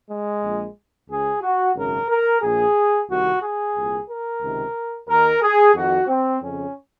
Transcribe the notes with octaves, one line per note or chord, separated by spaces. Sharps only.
G#3
A#1 A#2
C#2 C#3 G#4
F#4
G#1 F#2 C#3 A#4
A#4
A#1 A#2 G#4
C2 C3 D#3 F#4
G#4
C2 A#2
A#4
C#2 C3 D#3
D#2 D#3 A#4
G#4
F2 D#3 F#4
C4
F2 C#3 C#4